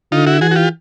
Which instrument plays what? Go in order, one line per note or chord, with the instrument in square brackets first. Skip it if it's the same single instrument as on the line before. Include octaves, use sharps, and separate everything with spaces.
[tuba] D3 [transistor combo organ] D#4 F4
[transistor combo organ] E4 F#4
[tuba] E3 [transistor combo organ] F#4 G#4
[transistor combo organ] F#4
F4 G4